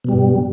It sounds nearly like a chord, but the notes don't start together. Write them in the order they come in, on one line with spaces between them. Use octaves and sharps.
B2 G3 G2